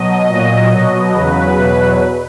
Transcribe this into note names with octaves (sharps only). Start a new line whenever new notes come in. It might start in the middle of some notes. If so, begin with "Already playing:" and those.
Already playing: B2 F#3 D#5
A#2
F#3
B2 F#3
E2 C#3 F#3 B4
E2 B2 F#3